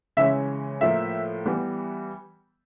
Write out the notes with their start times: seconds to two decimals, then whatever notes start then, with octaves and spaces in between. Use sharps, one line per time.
0.17 C#3 E3 G#3 C#4 E5
0.81 A2 F3 A#3 E5
1.46 E3 G3 B3